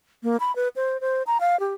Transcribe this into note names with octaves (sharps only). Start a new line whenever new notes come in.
A#3
B5
B4
C5
C5
A#5
F5
G4